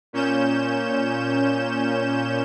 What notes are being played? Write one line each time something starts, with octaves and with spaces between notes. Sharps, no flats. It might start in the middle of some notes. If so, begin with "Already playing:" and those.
A#2 C#4 G6 E7